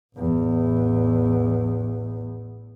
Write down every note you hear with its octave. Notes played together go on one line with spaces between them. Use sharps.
A1 E2